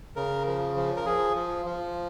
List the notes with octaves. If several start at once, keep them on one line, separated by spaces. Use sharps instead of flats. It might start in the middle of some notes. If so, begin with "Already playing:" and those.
C#3 A#4
F3
F3
A#4
F3 G#4
F3
F3